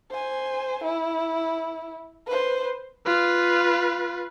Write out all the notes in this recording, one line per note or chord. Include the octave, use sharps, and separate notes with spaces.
C5 G#5
E4
B4 C5
F4 B4